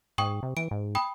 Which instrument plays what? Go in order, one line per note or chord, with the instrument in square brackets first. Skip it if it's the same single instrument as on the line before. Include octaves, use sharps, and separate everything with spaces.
[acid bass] G#2 [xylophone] G5 C#6 D#6
[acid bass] C3
[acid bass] E3 [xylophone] D7
[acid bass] G#2
[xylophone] G5 B5 D#6